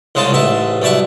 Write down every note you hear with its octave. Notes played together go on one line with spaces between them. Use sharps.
C2 C#3 G#3 C4 A5
A1 G#2 E5 A5
C2 F#2 D5 E5 A5